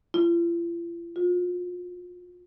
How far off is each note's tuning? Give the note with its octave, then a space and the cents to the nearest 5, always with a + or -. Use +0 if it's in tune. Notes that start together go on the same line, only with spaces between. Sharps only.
F4 -45
F4 +35